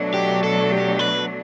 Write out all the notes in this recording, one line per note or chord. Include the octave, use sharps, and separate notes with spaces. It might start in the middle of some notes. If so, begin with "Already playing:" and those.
Already playing: B2 F#3 A3 D4
G4
A4
G4
B4